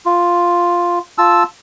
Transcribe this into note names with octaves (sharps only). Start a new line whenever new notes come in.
F4
F4 A5 E6